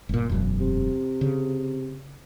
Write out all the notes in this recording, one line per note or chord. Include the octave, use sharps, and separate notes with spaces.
G1 A#2
E1 F#2
C3
C#3